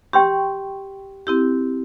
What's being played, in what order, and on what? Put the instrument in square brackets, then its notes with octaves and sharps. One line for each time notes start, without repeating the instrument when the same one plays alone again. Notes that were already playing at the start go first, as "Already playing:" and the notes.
[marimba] G4 [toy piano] G5 C6 C#6
[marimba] C4 E4 G4